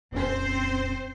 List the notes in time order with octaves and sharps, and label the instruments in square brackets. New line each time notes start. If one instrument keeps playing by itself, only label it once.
[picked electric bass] D#1 F2 C#4 [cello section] C4 C5